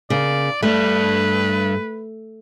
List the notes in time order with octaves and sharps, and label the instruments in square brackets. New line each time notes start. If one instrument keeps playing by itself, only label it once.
[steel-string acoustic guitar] C#3 A#3 [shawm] D5
[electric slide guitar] G2 G3 D5 [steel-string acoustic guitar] A3 [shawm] B4